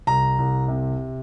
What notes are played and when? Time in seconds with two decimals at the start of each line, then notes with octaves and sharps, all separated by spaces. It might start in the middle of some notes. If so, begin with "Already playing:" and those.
0.07 C2 A#5
0.38 C2
0.68 C3